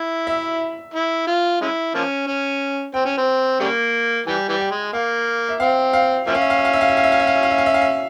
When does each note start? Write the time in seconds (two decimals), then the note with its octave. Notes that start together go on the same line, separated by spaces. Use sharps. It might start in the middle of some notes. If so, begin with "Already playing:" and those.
Already playing: E4
0.27 E5
0.94 E4
1.27 F4
1.61 G#3 C#4 E4
1.95 F3 A#3 C#4
2.27 C#4
2.94 C4 G5
3.05 C#4
3.17 C4
3.60 C#3 G3 A#3
4.27 E3 G3 G#5
4.49 E3 G3
4.60 G5
4.71 G#3
4.93 A#3 F5
5.49 E5
5.60 C4 F5
5.93 F5
6.27 F3 A#3 C#4 E5
6.35 F5
6.42 E5
6.50 F5
6.58 E5
6.65 F5
6.73 E5
6.81 F5
6.89 E5
6.97 F5
7.04 E5
7.12 F5
7.20 E5
7.27 F5
7.35 E5
7.43 F5
7.51 E5
7.58 F5
7.66 E5
7.74 F5
7.82 E5